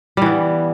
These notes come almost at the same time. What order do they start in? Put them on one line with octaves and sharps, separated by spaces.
G3 E3 B3